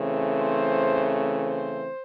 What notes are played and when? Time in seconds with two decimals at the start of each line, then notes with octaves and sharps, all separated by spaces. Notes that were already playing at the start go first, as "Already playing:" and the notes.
Already playing: C#3 E3 A3 C4
0.36 C5
1.38 C5